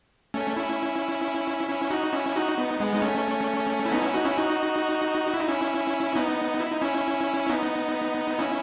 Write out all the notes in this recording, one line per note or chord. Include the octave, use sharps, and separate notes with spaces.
A3 C#4
C#4 E4
C#4 E4
D#4 F#4
C#4 E4
D#4 F#4
B3 D#4
G#3 B3
D#4
A3 C#4
E4
B3 D#4
C#4 E4
D#4 F#4
C#4 E4
D#4 F#4
F#4
E4
D#4
C#4 E4
B3 D#4
E4
D#4
C#4 E4
B3 D#4
C#4 E4